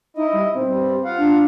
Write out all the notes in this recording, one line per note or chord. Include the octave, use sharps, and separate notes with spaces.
D#4 E4 D#5
G3
B2 D#3 C4
G2 G3
F4 F5 F#5
D4